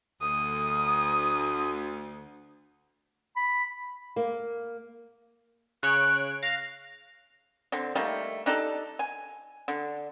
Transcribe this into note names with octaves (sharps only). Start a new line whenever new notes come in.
D2 D#6
B5
A#3
C#3 C#5 F#6 D7
F5 A#6
D3 C4
D#3 G3 A3 A#3
D4 D#4 G4 A4
G#5
D3